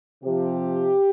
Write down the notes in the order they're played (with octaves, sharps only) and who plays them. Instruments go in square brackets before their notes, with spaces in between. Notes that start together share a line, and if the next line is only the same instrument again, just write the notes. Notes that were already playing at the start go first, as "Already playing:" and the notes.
[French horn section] C3 F3 G4